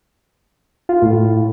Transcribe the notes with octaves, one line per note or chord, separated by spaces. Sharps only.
F4
A2